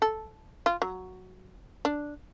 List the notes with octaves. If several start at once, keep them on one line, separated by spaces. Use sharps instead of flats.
A4
F4
F#3
D4